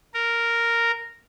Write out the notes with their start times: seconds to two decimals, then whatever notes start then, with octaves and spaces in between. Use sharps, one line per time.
0.14 A#4